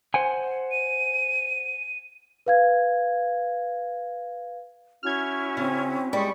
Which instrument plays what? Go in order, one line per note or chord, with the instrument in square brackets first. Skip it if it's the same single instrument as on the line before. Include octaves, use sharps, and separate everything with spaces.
[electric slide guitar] C5 F#5 G#5
[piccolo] D#7
[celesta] B4 F5 G#6
[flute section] C#4 E4 F#4 [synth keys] F6 G#6
[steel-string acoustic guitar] C#3 [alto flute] C4
[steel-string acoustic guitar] G3 [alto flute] G#3 [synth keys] B5 C#6